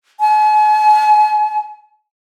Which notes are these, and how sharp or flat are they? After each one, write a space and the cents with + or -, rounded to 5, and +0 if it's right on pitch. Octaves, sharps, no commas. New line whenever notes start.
G#5 +40